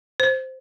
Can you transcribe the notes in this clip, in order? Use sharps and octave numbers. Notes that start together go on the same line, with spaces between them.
C5